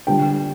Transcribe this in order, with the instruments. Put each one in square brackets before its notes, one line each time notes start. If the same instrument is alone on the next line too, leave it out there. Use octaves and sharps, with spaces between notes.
[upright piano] D3 G3 G5